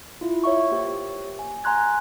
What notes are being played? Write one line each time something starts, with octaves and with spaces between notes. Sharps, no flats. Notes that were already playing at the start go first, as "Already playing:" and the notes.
E4 F4
C#5 E5 C#6
A#3 G4 C5
G#5
G#5 A#5 C6 F#6 G#6